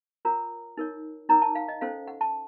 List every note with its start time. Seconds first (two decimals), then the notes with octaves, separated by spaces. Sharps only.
0.25 F4 A#4 C#5 A#5
0.77 D#4 A#4 C#5
1.29 D#4 A#4 C#5 A#5
1.42 A5
1.55 F5
1.68 D#5
1.81 C#4 A4 C5 F5
2.07 F#5
2.21 A5